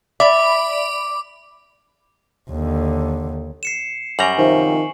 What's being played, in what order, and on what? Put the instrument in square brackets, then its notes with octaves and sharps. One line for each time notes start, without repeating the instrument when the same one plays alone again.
[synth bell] D5 B5 [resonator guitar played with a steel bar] E5 [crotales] D6
[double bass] D#2 D3
[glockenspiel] C7 C#7 E7
[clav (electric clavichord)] F#2 G3 A#5 [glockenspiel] G#5 C#6 F#7
[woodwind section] C3 F3 [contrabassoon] D#3